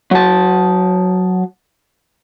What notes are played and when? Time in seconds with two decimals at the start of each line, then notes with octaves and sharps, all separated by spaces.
0.11 F#3 A5